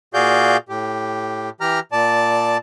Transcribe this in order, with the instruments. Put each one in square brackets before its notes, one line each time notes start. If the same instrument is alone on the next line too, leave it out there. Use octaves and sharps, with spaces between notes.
[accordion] A#2 F#4 G#4 D5 F5 G6
A2 G4
E3 G4 A#5 F6
A#2 D5 A5